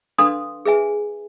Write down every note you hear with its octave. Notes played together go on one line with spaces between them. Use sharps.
D4 A4 B4 F5 C6 D#6
G#4 B4 E5 G#5